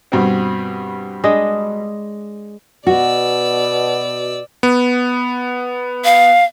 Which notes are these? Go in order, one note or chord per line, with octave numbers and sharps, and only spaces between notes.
G2 B2 C4
G#3 D4 D#5
B2 F#4 D5 E6
B3
F5